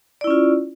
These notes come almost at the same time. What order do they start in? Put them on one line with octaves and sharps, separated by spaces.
D5 E4 C#4 F4